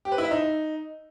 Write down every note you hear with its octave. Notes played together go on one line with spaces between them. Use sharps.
G4
B4
E4
E5
D#4